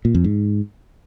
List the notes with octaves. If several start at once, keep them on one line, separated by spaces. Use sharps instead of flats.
A#2
F2
G#2